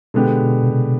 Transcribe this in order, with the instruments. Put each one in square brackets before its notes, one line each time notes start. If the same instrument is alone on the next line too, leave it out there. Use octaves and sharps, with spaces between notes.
[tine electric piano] B2 [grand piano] D3 G#3 B3 D4 G4
[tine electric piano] B2
C3
B2